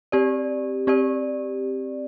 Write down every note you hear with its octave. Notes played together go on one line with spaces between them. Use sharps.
C4 G4 D5
C4 G4 D5